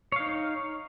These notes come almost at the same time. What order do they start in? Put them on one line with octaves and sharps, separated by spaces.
C#5 F5 D#4